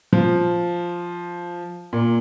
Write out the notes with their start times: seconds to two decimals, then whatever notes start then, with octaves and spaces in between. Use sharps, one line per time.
0.13 F3
1.93 A#2